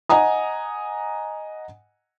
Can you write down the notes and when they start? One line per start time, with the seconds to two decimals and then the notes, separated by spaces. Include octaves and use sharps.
0.09 D#5 F#5 G#5 A#5 D#6